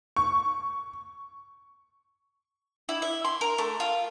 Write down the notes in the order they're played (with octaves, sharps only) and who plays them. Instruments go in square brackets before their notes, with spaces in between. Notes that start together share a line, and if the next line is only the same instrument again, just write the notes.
[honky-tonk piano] C#6
[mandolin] E4
E5
C6
A#4
A3
F4